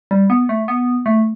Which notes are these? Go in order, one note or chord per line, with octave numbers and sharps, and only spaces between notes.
G3
B3
A3
B3
A3